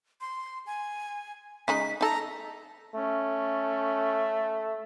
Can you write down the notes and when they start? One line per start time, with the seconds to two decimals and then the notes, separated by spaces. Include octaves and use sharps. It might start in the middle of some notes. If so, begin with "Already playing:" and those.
0.21 C6
0.67 G#5
1.68 C#3 G#3 D#4 B6
2.01 D#4 A4 A#5
2.95 A3 C#4